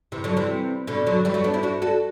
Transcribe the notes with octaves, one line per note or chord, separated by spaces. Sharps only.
C3 E3
D3 F#3
C3 E3
B2 D3
D3 F#3
E3 G3
F#3 A3
B3 D4
C4 E4
D4 F#4
F#4 A4